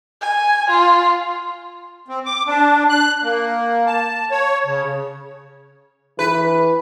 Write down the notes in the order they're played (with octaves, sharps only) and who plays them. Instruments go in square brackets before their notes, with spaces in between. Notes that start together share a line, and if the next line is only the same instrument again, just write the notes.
[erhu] G#5
F4
[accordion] C4
D6
D4
F#6
A#3
A5
C#5
C#3
[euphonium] E3 [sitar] B4